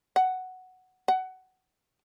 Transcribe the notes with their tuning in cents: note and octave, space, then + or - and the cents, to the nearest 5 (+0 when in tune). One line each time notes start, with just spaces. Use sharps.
F#5 +5
F#5 +15